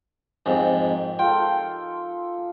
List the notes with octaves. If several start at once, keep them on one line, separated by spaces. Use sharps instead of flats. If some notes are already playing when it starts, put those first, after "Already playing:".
F2 G#2 A#3 D#4 G4
F4 A4 G5